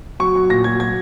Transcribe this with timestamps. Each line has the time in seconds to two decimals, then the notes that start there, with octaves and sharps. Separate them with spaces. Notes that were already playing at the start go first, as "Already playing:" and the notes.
0.20 F#3 C#6
0.35 F#3
0.50 A#2 A#6
0.64 F#3 G#6
0.80 F#3 G#6